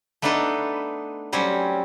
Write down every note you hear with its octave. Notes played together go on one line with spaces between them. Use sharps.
A3 B3 D4 D#4 A4 B4
F#3 G3 C4 C#4